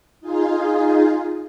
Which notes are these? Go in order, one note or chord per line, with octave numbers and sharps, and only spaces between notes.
D#4 F4 G#4